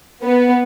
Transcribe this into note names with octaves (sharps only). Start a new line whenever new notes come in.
B3